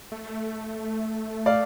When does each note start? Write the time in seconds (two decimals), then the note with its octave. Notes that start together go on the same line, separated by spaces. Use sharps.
0.12 A3
1.46 D5 F5